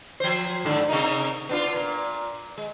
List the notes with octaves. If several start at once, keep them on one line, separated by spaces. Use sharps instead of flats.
F3 C5
G#2 D3
C3 A#3 D#4
B3 D4 F4
A#2
G#3